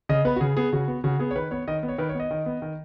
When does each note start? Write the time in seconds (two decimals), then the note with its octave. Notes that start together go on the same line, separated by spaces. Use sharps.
0.09 C#3 D#5
0.25 B3 B4
0.36 F#4
0.41 C#3 G#4
0.57 B3 G#4
0.73 C#3 F#4
0.88 B3
1.04 C#3 F#4
1.19 B3 G#4
1.31 C#5
1.36 D#3 B4
1.51 B3 C#5
1.68 D#3 D#5
1.83 B3
1.88 C#5
1.98 D#3 B4
2.09 C#5
2.15 B3 D#5
2.31 D#3
2.46 B3
2.62 D#3